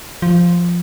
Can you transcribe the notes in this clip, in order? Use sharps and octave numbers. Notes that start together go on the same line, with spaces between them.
F3